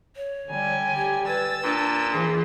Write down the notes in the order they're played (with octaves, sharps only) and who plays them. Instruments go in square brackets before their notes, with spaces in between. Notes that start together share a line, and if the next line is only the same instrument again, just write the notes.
[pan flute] C#5
[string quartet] D3 G3 G#5
[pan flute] G4
[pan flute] B4 [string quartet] E6 A6
[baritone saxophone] A#2 [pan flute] D4
[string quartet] E3 F3 [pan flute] G#4